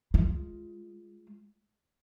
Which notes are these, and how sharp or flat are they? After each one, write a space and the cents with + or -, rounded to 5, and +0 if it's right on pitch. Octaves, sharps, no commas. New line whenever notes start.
G#3 +0 F4 -10